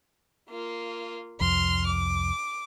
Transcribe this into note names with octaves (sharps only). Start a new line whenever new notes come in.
A#3 F4
C2 F2 C6 F6
D6